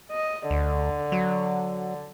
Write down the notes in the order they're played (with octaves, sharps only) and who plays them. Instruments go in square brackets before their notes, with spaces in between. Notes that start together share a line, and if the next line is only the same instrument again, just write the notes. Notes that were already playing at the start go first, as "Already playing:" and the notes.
[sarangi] D#5
[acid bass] D2 [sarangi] D3
[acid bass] F#3